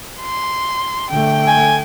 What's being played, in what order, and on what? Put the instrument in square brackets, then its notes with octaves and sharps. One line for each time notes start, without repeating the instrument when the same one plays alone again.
[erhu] C6
[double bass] D3 A3 [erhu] G5
[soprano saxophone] G#5